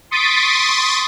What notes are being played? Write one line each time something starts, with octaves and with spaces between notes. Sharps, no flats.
C6 C#6 D#6 A6 B6 D7